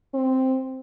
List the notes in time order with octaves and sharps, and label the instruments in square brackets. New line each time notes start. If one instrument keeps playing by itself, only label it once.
[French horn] C4